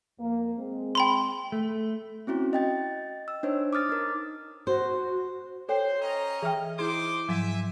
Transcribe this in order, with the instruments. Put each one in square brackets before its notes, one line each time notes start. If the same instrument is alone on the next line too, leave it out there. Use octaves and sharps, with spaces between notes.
[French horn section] F2 A#3
G#3 C4
[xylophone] G5 B5 C6
[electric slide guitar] A3
[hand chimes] C4 C#4 E4 F#4
D#5 G5 A6
E6
D4 D#4 C5 C#5
D6 D#6 F6 A6
D#4 A#4
[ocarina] F#4 [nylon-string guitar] C5
[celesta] A4 C#5 G5 [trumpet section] C5
[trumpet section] C#4 D#5 A#5
[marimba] E3 E5 F6 [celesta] G#4 G5
[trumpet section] D#4 C5 D6 [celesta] E4 C6 [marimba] G#4
[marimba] G#2 F3 F#3 [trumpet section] E5 G#5